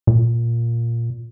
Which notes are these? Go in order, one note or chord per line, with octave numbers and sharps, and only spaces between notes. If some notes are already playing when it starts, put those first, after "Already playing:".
A#2